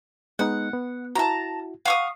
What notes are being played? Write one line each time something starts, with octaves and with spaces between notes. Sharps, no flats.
G#3 B3 D#4 F#5
B3
E4 F#4 A5 A#5
F5 F#5 C#6 D#6